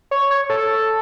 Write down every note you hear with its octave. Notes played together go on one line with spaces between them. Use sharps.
C#5
C#5
A4